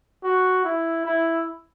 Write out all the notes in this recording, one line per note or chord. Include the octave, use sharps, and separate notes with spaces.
F#4
E4
E4